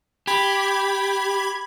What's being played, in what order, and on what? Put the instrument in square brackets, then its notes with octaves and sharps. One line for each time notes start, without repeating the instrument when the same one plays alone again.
[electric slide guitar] G4 [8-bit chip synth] B5 G#6